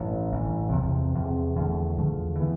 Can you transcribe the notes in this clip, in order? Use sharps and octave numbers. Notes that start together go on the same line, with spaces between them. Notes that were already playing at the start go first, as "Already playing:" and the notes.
Already playing: A1 G2 E3
A1 G2 E3
E2 C3 F3 C4
E2 C3 F3 C4
E2 D3 F3 A3
E2 D3 F3 A3
E3 B3